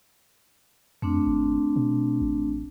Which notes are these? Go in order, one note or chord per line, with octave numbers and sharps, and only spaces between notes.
F2 A3 C4 D4
G#1
B2
A1